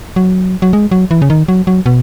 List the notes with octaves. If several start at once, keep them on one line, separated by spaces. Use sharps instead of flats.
F#3
F#3
G#3
F#3
E3
C#3
D#3
F#3
F#3
B2